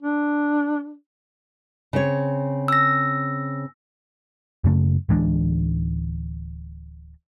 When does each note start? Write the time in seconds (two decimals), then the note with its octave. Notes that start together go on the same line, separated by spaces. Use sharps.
0.03 D4
1.93 C#3 C4 C#5
2.68 E6 A#6
4.64 F#2 C#3 A3
5.09 D1 E3 G#3 D4